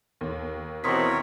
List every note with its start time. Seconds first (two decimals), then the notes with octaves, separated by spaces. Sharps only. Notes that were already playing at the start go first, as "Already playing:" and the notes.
0.21 D#2
0.84 B2 E3 C4 A#4 C#5 C6 D#6 B6